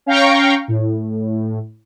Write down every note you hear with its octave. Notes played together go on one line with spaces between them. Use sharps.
C#4 F5 G5 A#5 C#6
A2